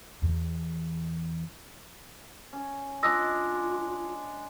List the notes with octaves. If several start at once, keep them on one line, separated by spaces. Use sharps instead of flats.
E2
C#4
G#3 D4 F4 D#6 E6 A#6